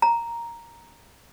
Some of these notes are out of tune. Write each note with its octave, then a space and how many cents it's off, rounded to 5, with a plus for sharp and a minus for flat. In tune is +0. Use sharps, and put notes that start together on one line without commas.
A#5 +0